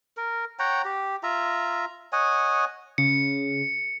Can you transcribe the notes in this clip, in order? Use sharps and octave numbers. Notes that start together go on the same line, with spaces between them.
A#4
C#5 F#5 G5 A#5
G4
F4 E5 A#5
C#5 D#5 F#5 G#5
C#3 C#7